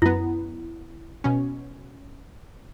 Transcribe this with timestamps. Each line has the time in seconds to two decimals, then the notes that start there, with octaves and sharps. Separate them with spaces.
0.02 F#2 B3 E4
1.24 B2 C#4